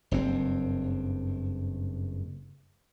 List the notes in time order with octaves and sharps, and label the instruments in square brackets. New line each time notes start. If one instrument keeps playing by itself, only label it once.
[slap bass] F#1 G2 C4